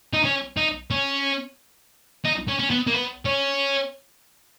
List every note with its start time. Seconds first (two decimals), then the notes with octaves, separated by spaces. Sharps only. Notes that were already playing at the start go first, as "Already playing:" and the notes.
0.13 D#4
0.24 C#4
0.57 D#4
0.91 C#4
2.25 D#4
2.48 C#4
2.59 C#4
2.70 B3
2.87 A#3
2.93 B3
3.25 C#4